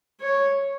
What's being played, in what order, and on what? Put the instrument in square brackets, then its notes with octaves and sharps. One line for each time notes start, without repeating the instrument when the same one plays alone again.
[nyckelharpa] C#5